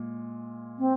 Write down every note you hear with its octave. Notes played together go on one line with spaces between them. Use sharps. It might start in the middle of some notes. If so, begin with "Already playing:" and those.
Already playing: A#2 G#3
C4